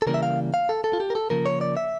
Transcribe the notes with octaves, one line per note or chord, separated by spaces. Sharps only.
A4
C#3 E3 G3 A#3 A#4
E5
F5
F5
A4
A4
F4
G4
A#4
A4
C#3 F3 A#3 A#4
C#5
D5
E5